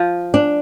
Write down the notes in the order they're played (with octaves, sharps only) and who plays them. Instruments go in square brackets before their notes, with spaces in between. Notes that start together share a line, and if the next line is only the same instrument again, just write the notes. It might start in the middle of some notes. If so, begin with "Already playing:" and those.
Already playing: [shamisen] F3
[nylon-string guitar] D4